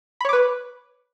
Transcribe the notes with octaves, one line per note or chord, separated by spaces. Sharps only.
B4 C#5 B5 D6